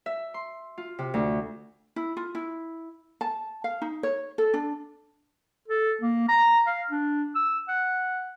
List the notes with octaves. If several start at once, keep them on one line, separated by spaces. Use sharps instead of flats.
E5
C6
F4
C3
D2
E4
F4
E4
A5
F5
D#4
C#5
A4
D4
A4
A#3
A#5
F5
D4
E6
F#5